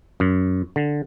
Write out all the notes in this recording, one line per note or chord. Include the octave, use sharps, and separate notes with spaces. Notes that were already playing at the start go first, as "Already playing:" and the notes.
F#2
D3